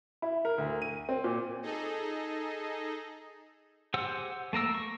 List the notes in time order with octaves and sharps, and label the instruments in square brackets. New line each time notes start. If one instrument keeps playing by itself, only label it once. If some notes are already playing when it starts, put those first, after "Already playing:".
[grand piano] E4
A#4
D2
D#7
C4
A#2
[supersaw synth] D#4 G#4 A4 D#5
[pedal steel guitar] G4 G#4 C5 F#5 E6
A3 A#3 A#4 E6
C#6